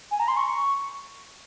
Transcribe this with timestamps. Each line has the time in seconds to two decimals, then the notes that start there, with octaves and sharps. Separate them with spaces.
0.11 G#5
0.20 A#5
0.28 C6
0.37 C#6